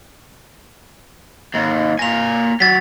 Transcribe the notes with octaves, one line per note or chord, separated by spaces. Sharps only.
D#2 G#2
A#3 G#5 A#6 F7
F#3 A6 B6